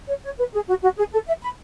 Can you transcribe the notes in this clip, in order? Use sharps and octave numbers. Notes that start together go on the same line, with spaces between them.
C#5
C#5
B4
G#4
F#4
F#4
G#4
A4
E5
B5